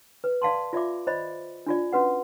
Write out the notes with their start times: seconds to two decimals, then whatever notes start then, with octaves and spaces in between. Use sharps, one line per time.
0.24 B4
0.42 D5 F5 A5 C6
0.73 F4 D5 E5 D6
1.07 C5 D5 D#5 B5
1.66 D4 F4 D5
1.92 C#4 F#4 B4 F#5